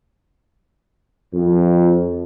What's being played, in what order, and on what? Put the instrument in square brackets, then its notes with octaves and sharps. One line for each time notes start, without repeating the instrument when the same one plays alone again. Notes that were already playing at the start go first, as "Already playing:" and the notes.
[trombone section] F2